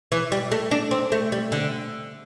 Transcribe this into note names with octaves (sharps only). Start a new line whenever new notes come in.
E3
G3
A3
D4
C4
A3
G3
D3